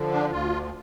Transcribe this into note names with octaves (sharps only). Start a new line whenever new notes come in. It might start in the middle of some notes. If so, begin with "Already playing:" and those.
Already playing: D3 F3
D4
D2 F4